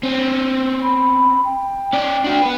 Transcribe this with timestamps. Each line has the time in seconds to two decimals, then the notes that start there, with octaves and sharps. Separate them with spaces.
0.03 C4 C#4
0.82 B5
1.44 G5
1.93 C#4 D5
2.24 D4 F#4
2.42 B3 B4